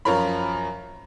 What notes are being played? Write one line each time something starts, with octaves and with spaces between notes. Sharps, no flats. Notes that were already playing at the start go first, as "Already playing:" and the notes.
F#2 F3 F4 A#4 C#5 B5